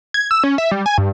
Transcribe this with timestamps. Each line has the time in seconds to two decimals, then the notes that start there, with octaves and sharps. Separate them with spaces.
0.14 G#6
0.31 E6
0.43 C#4
0.58 E5
0.71 G3
0.86 G#5
0.98 G2